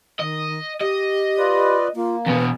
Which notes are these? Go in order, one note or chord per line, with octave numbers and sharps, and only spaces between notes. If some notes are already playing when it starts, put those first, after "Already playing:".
D#3 D#5
G4 D#5
F4 B4 D5
A#3 F4
E2 B2 B4